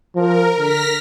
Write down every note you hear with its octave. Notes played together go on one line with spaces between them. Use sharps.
F3 A#4
D3 F6 A#6 B6